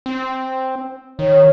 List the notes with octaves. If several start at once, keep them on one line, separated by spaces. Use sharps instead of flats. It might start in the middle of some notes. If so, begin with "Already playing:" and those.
C4
D#3 C#5